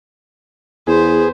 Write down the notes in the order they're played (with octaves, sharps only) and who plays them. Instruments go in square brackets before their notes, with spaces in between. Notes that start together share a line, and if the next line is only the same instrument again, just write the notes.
[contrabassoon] E2 [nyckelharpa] B3 C5 [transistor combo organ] G#4